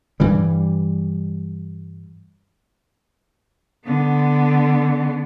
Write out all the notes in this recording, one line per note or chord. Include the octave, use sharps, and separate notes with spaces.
G2 E3 G3
D3 B3